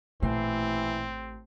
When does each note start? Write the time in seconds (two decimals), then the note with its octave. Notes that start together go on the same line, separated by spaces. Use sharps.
0.22 A1 A#2 E3 A3 C4 C7